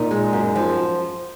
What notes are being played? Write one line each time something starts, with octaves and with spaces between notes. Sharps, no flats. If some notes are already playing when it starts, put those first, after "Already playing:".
Already playing: A#2 D#4
G#3
F#2
F3